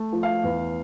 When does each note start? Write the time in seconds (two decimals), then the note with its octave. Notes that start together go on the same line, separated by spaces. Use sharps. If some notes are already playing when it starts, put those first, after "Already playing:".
Already playing: A3
0.12 F3
0.23 F5
0.44 E2